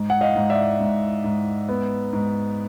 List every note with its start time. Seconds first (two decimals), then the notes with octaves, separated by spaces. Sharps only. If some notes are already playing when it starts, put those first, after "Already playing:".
Already playing: G#2
0.10 F#5
0.21 D#5 F5
0.35 G#2
0.50 D5 E5
0.80 G#2
1.24 G#2
1.69 B3
2.13 G#2